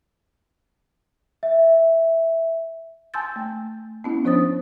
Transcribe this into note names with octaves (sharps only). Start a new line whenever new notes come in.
E5
G#5 A5 C6 E6 G6 A6
A3
B3 C#4 E4
F3 D4 C5 C#5 D#6 A6